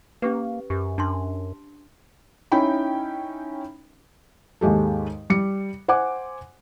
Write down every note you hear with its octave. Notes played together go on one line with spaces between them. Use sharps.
A#3 C#4 G4 B4
F#2 G4
F#2 D4 A5 C6
C#4 D#4 E4 G5 B5
D#2 G#2 G#3 G4 A4
G3 C#7
C5 F#5 G#5 D6